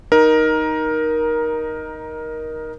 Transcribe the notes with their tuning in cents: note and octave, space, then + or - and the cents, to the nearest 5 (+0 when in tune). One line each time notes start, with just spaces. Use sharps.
D#4 +0 A#4 +15